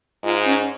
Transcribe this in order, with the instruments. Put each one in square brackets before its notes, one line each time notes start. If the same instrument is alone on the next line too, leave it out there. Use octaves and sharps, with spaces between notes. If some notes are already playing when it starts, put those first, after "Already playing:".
[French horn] G#2 [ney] F4
[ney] C#4